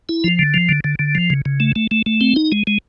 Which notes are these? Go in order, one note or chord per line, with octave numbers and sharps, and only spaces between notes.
E4
F3
D3
F3
D3
D3
D3
F3
C#3
C#3
A3
A3
A3
A3
C4
D#4
G#3
G#3